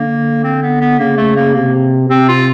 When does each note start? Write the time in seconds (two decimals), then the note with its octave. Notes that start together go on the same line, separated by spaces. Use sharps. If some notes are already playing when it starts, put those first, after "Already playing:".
Already playing: D3 A#3
0.44 C4
0.62 B3
0.81 B3
0.99 C#3 A#3
1.17 A3
1.36 A#3
1.54 C3 A#3
2.10 C3 C4
2.28 F4